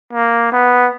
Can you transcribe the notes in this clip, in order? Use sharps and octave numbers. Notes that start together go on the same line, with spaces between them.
A#3
B3